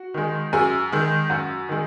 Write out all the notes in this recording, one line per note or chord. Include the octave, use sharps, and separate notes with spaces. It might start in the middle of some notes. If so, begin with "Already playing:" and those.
Already playing: F#4
D#3 G#3
F#2 G#4
D#3 G#3
F#2 F#4
D#3 G#3